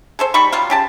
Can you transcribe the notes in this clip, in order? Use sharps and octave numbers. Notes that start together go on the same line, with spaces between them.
G#4 A4 C5
G3 D#4 B5 C#6
F#3 G3 F4
C#3 G4 A5